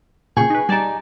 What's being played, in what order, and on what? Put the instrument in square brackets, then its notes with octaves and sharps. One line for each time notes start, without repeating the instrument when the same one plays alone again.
[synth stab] A#2 C#3 [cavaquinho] G#4 G5 C#6
[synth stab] D#4 B4
[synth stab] G3 D5 A5 [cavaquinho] D#4 G#5